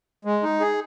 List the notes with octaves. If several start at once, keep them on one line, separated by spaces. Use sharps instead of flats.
G#3
D#4
G#4